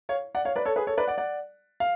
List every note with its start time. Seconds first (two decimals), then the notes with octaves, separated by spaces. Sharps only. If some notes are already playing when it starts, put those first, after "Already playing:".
0.09 C#5 F5
0.35 D5 F#5
0.45 C#5 F5
0.56 B4 D5
0.65 A4 C#5
0.76 G#4 B4
0.87 A4 C#5
0.97 B4 D5
1.07 D5 F#5
1.18 D5 F#5
1.80 F5